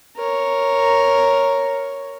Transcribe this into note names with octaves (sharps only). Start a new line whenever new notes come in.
A#4 C#5